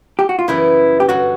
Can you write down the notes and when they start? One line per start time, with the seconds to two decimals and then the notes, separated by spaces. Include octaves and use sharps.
0.19 G4
0.29 F#4
0.39 F4
0.48 F#2 C#3 E3 G3 B3 E4
1.00 G4
1.09 G2 D3 F#3 F#4